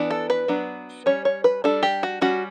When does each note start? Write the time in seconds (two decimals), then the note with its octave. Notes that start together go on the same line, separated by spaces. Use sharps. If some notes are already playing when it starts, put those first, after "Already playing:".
Already playing: E3 B3 D4
0.11 A4
0.30 B4
0.48 F#3 B3 D4
1.06 G3 C#4 C#5
1.25 C#5
1.44 B4
1.64 G3 D4 A4
1.83 G4
2.03 F#4
2.22 G3 C#4 F#4